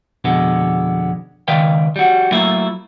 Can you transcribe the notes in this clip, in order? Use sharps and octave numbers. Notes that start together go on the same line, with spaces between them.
F2 B2 D3 G#3 B3
C#2 D#3 B4 D5 F5 G5
G3 F#4
F#3 A3 A#3 E4 F4